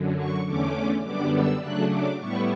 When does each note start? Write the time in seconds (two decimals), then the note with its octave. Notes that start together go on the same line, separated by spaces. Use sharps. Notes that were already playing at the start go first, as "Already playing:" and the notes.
Already playing: F#2 D3 F#3
0.18 C#6
0.46 E2 D3 A3 C#4 D6
1.03 F#2 D3 G3 B3 D4 D6
1.32 E6
1.61 C#3 F#3 A3 D4 F#6
1.90 D6
2.19 A2 G3 B3 E4 C#6